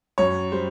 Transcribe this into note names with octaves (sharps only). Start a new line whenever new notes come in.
F#2 C#5
G3 C5